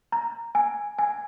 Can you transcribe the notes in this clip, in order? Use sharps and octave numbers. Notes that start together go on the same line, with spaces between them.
A#5
G#5
G#5